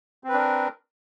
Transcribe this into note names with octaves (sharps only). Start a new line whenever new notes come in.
C4 D4 A#4 B4